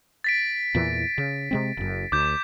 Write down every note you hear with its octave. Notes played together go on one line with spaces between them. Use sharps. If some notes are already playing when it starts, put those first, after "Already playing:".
A6 B6 D7
E2 A#2 E3
C#3
C3 G#3 C4
F#1 F#2
D2 D6 G6